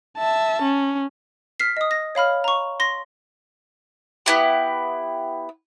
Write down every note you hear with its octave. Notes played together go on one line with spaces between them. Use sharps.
E5 A5
C#4
F6 B6 C7
D#5 D#6
A#6
C#5 F5 B5 F6
A#5 C#6
C6 A#6
B3 E4 G4